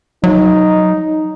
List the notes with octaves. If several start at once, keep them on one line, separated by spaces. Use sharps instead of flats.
F#3 D#4